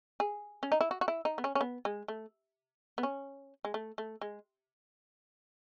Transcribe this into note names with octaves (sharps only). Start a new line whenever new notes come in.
G#4
C#4
D#4
E4
F#4
F#4
E4
D#4
B3
C#4
C#4
B3
G#3
A3
B3
C#4
G#3
A3
A3
G#3